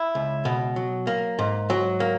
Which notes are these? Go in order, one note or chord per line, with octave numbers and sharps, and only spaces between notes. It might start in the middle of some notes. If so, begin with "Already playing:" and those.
Already playing: E4
C#2
B2
F#3
A#3
G#2
F#3
A#3